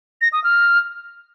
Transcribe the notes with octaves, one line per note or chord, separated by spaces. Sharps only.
A#6
D#6
F6